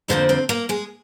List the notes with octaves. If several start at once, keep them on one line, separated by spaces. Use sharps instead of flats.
F2 D3 F3 A#3 C4 C5
C4 C5
A#3 A#4
G#3 G#4